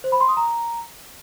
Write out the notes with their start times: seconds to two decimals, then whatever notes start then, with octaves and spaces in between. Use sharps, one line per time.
0.04 C5
0.12 B5
0.20 C6
0.29 D#6
0.37 A#5